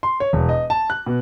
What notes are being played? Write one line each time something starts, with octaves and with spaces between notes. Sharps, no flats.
C6
C#5
E1
D#5
A5
F#6
B2